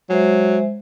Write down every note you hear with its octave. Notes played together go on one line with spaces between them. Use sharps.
F#3 G#3 C5 E5